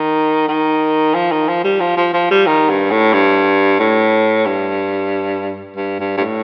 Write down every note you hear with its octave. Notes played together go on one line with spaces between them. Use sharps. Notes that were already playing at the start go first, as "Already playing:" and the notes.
Already playing: D#3
D#3
F3
D#3
F3
G3
F3
F3
F3
G3
D#3
G2
A2
G2
A2
G2
G2
G2
G2
A2